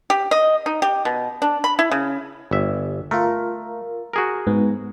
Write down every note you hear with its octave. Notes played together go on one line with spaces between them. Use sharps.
G4
D#5
D#4
G4
B2
D4
B5
E4
C#3
G1 E5
A3 F4 A#4
F#4 G#4 A#4
G#2 B3